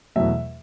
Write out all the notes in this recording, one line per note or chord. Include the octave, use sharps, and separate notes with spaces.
E2 B2 F#3 A3 E5